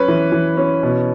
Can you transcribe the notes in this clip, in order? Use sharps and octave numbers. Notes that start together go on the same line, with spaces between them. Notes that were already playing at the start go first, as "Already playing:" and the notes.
Already playing: F#3 C#4 B4
E3
E3
C#4
B2